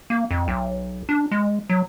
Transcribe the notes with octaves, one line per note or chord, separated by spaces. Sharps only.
A#3
F2
B1
D4
G#3
F#3